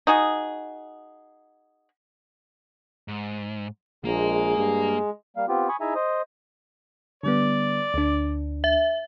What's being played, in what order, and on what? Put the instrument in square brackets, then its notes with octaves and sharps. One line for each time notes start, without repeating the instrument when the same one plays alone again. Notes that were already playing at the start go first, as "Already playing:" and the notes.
[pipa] D#4 F#4 G#4
[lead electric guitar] G#2
[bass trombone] A#1 [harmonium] G#3 [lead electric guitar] A#3 A#4
[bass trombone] G2
[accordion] G3 A#3 F5
B3 C4 F4 G4
G#5 B5 C#6 D#6
D#4 E4 G#4 E5 G#5 A#5
C5 D#5 D#6
[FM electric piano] D3 G3 B3 [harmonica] D5
[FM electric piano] D2 D4
[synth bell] E5